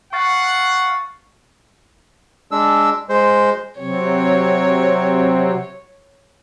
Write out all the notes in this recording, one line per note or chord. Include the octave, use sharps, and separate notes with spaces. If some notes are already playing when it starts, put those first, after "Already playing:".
F5 F#5 C#6 A6
G#3 D4 E6
G#3 C5
C3 F#3 C4 C#5